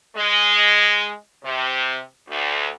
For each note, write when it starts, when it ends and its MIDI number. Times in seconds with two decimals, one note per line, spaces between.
0.16 1.13 56
1.45 1.99 48
2.29 2.67 38